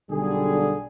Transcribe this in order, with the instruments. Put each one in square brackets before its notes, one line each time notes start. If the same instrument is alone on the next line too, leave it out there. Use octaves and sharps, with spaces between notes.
[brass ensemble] B1 D3 G3 G#4